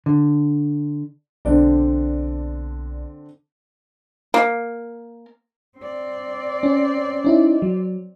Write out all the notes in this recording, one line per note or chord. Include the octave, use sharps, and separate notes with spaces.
D3
B1 D3 C4 D4 D5
A#3
C4 D5
C#4
C#4 D#4 E4
F#3